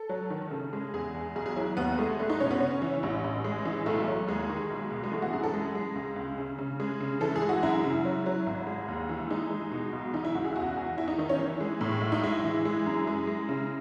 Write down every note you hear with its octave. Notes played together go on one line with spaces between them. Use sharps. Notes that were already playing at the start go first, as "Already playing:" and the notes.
Already playing: A4
F#3
D#3
C#3
G#3
E2 G#4
E2
B1 G#4
G#4
F#3 E4
D#2 B3
G#3 A3
F#1 A3
D#4
B2 C#4
B3
C#3 C#4
E3
A1
A1
G#3
E3
B1 A3
F#3
D#2 G#3
D#3
B1
B2
G#3
E3 A3
F#4
F#2 G#4
A4
G#3
G#3
C#2
C#2
C#3
C#3
G#3
C#3
E3 A4
G#4
G#3
F#4
F#2 E4
C#3
F#3
F#3
G#1
G#3
D#2
E3
G#3 D#4
G#3
B2
B1
E3 D#4
E4
C#2 F#4
G#4
E2 F#4
E2
E2 E4
D#4
D#3 D#4
C#4
E3
G#3
A2
B1
D#4
G#3 E4
E3
G#3
F#2
G#3
G#3
C#3